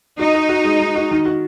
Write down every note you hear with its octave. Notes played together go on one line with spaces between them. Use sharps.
D#4 F#4
F#4
F#4
G#3
G#3
F#4
D#3
F#4